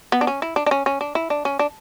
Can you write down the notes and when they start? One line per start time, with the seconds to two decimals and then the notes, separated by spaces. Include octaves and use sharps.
0.12 B3
0.21 D4
0.27 C#4
0.42 E4
0.56 D4
0.66 D4
0.71 C#4
0.86 C#4
1.01 D4
1.15 E4
1.30 D4
1.45 C#4
1.59 D4